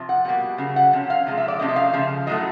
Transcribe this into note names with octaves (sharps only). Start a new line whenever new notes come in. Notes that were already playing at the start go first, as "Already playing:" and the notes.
Already playing: C3 F3
F#5
B2 G3 A#3 F#5
C#3 F#3
F#5
C3 F3 C#4
F5
C3 F3 G#3
E5
D5
C3 F3 A3 C#4 D#5
E5
F5
C#3 F3
A2 F#3 A3 D#5